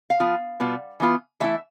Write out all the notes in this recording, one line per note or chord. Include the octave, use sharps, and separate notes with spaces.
F5
F3 B3 F4
B2 G3 B3 F4
E3 B3 F4
E3 A3 E4 E5